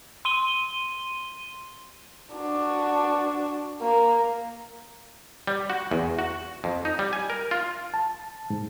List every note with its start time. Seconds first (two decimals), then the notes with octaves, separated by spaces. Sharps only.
0.25 C6 D#7 G7
2.35 D4 F#4
3.82 A#3
5.47 G3
5.70 F#4
5.91 E2
6.19 F#4
6.64 F2
6.85 D#4
6.99 G3
7.13 G#5
7.30 A#4
7.51 F4
7.94 A5
8.50 G#2